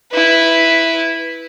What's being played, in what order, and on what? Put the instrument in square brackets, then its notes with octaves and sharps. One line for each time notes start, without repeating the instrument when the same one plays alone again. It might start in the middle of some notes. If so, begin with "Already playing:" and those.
[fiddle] E4 B4